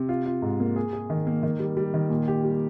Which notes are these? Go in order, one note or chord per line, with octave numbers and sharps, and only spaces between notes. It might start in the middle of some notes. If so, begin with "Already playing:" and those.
Already playing: C3
F4
F4
G#2
A#3
G#4
G#4
D#3
A#3
D#3
G3
G3
D#3
A#2
G4
G3